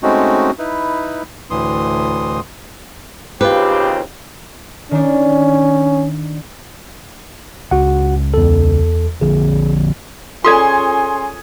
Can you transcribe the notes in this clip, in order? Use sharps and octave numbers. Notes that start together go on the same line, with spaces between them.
G#3 A3 C4 C#4 D#4 F#4
D#4 E4 B4
D2 A2 E3 C6 D#6
D#2 C#3 C4 F4 G4 B4
D#3 C#4 D4
C#2 F#4 F#5
E2 A4
A#1 D3 F3 G#4
C#4 F4 G#4 A4 D5 C6 D#6 G#6